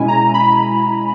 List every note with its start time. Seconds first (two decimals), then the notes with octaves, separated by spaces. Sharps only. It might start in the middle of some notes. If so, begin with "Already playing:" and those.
Already playing: B2 G#3 C#4 E4 G#5
0.08 A#5
0.34 B5